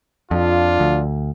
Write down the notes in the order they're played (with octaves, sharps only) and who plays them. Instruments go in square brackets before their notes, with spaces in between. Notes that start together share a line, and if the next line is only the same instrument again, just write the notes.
[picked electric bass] F2 [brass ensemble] F3 D4 F4
[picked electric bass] D2